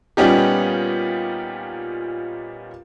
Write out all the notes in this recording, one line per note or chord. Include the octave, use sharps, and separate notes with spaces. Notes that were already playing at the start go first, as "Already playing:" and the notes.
A#2 G3 B3 C#4 D#4 G4